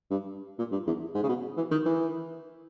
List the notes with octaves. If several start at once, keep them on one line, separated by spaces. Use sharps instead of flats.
G2
A#2
G2
E2
G#2
C#3
B2
E3
D#3
E3